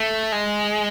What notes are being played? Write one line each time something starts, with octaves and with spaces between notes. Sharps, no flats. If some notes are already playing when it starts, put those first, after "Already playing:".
Already playing: A3
G#3